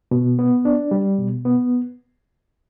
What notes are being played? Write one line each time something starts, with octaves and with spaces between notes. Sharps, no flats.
B2
B3
D4
G3
B2
B3